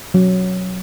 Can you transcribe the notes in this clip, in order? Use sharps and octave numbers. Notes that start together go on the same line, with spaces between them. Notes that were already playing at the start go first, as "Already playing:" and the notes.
F#3